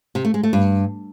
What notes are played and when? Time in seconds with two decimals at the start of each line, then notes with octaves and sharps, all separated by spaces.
0.15 C3
0.25 A3
0.34 G#3
0.43 A3
0.53 G2